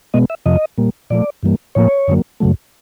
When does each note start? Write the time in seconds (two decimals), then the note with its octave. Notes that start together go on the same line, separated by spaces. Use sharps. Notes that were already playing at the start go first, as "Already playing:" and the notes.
0.14 B2 G#3 B3 D#5
0.30 E5
0.46 F2 C3 F3 D#5
0.78 A#2 G3 A#3
1.10 A#2 F3 A3 D5
1.43 G2 E3 G3 A#3
1.75 A2 F3 A#3 C#5
2.08 F#2 D3 F#3 A#3
2.40 F#2 C#3 F#3 A3